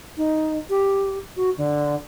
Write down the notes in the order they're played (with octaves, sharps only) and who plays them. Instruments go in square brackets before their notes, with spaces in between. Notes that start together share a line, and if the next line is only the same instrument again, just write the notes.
[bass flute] D#4
G4
F#4
D3